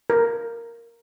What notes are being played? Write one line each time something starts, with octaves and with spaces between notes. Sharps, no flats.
A#4